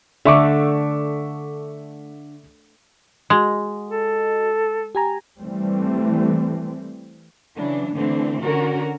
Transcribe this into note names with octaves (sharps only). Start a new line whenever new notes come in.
D3 A3 E5 C#6 D6
G#3 F#4 D#5
A4
G4 G#5 A#5
E3 G3 A3 C4
C#3 E3 F#3 D4
D3 E3 A3 C4 D4
D3 C#4 F#4 A#4